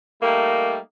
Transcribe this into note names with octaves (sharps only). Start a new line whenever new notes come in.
G3 A3 A#3 D#4